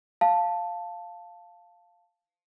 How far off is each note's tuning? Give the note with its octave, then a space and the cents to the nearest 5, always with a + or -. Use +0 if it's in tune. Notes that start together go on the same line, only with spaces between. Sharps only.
F5 +0 A5 +0